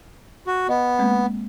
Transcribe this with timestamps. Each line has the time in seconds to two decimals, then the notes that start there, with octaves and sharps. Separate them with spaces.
0.47 F#4
0.69 B3 D#5
0.99 G#3 A#3 C4